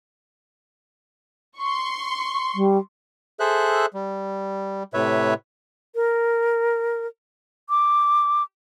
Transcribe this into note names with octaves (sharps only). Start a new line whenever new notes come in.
C6 C#6
G3
G#4 A4 C5 E5 F#6
G3
A2 C3 B4 C#5 E5
A#4
D6